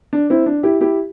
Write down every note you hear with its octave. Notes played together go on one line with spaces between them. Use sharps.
D4
C4 E4
D4
E4 G4
E4 G4